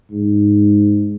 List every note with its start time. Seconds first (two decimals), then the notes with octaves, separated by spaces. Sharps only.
0.11 G#2